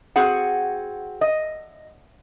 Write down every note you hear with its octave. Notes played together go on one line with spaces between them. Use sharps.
C4 F#4 G#4 F#5
D#5